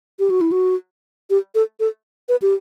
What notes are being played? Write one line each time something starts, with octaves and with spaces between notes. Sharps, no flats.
G4
F#4
E4
F#4
G4
A4
A4
B4
G4